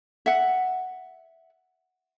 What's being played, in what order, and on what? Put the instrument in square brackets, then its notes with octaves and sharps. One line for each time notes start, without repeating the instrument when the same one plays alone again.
[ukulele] E5 F#5